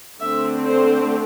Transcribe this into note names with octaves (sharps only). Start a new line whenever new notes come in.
D3 A3 C4 E5
C5